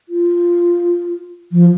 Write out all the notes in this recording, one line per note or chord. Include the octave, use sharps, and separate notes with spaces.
F4
F3